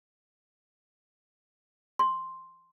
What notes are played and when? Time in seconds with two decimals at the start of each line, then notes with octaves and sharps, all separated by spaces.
1.99 C6